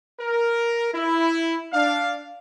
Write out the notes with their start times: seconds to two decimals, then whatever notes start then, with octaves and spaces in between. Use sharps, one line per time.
0.19 A#4
0.93 E4
1.72 D4 F5